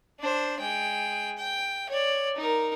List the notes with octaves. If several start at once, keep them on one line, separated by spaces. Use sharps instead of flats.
D4 C5
G#3 G5
G5
C#5 D5
D#4 A#4